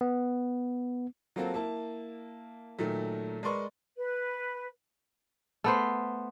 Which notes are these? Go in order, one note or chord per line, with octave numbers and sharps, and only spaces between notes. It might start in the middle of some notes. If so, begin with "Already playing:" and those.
B3
F#3 A#3 C4 F4 F#4 A4
A#3 E4 A5
A#2 D#3 F#3 A3
G#3 A#4 B4 D5 C6 C#6
B4
A3 B3 C5